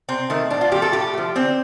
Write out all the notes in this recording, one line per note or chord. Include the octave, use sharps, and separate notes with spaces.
C3 C4
D#3 A3
A2 D4
F4
F3 A3 G4
A4
A2 G4
F3 A3
D3 C4